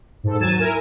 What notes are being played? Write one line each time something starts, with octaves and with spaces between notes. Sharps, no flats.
G#2 A4
D#2 F#3 G#5 A6 E7
E4 A#4 G#5